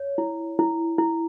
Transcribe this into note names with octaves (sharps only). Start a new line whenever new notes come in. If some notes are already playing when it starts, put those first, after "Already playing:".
Already playing: C#5
E4
E4
E4